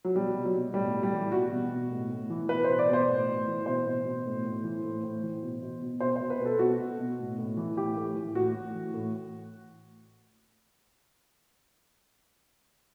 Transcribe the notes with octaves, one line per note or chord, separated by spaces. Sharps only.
F#3
B2 G3
B2
F#3
B2
A2 G3
A2
G3
E3
B2 F#4
B2
B2
A2
A2
E3
B2 B4
B2 C5
D5
B2 C5
A2
A2
E3
B2 C5
B2
B2
A2
A2
E3
A2
A2
E3
B2
B2
B2
B2 C5
B2 C5
B4
B2
A4
B2 F#4
B2
B2
A2
A2
E3
A2 G4
A2
E3
A2 F#4
A2
E3
A2